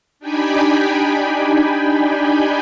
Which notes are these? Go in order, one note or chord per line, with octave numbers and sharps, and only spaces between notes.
D4 D#4 G4 G5 G#5 B5